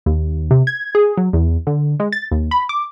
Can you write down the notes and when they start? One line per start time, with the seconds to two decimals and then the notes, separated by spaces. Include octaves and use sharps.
0.06 D#2
0.51 C3
0.67 G#6
0.95 G#4
1.17 F#3
1.33 E2
1.67 D3
2.00 G#3
2.12 A6
2.31 D#2
2.51 B5
2.69 D6